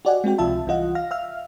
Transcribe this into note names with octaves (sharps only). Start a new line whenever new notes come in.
F#4 G4 D5 D#5 F#5 G#5
G#3 C4 F#4 G5
C#2 C3 F3 F4 E5 A5
C2 E3 G3 F4 D#5 F#5
F5 F6 A#6
E5 F5 F6